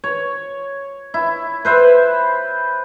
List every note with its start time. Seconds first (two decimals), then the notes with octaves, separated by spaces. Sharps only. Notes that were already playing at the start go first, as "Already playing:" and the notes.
0.04 C#5
1.14 E4
1.65 B4 C5 E5